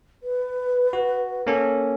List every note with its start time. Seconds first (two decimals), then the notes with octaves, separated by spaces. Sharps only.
0.23 B4
0.93 F#4
1.47 A#3 C#4 A4